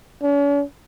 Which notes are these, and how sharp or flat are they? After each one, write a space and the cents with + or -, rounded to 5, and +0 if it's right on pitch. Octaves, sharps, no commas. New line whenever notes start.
C#4 +45